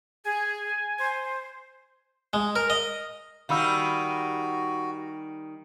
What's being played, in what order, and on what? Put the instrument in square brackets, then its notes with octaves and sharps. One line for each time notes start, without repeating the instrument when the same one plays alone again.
[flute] G#4 [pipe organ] G#5
[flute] C5
[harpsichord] G#3
A#4
D#5
[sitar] D#3 G3 D#4 [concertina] F#4 [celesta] F5 B5 E6